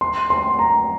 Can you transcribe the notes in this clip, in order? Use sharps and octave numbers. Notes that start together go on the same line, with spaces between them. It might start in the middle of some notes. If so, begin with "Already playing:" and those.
C6
C6
A#5